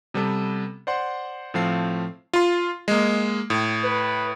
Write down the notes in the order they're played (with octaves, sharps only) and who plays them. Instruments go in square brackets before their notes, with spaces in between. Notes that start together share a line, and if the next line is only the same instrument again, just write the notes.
[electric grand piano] C3 G3 B3 A4
C5 D5 F#5 C6
A2 F3 A3 C4 F5 C7
F4 C6
G#3 A#3
A2
[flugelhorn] B4